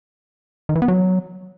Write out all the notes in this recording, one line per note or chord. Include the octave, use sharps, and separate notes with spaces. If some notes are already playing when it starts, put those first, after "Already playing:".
D#3
E3
B3
F#3